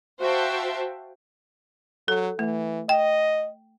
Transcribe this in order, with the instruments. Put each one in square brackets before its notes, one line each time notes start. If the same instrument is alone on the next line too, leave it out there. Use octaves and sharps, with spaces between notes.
[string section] F#4 C5 E5 F5 G5 A5
[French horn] F#3 [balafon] A4
[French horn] E3 [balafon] A3
[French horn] D#5 [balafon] G5